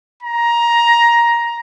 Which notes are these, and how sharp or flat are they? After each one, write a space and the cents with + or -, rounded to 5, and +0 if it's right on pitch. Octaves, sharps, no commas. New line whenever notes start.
A#5 +15